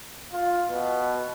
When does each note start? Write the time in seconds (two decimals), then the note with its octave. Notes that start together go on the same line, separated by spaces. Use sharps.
0.33 F4
0.70 B2